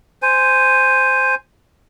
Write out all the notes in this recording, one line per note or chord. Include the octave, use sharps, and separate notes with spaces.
C5 G#5